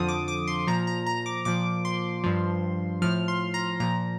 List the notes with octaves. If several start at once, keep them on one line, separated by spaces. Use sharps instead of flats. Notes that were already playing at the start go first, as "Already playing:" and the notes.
Already playing: F2 D3 F3 D#6
D6
D6
C6
A#2 F3 A#5
A#5
A#5
D6
A#2 F3 D6
C6
G2 F3
A2 F3 F6
C6
A#5
A#2 F3 A#5